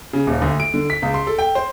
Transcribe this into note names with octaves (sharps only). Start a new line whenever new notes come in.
C#3
D#1
D2
D7
D3
B6
C#2
C6
A4
G5
C5